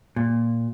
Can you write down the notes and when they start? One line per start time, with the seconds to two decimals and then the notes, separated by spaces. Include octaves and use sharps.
0.16 A#2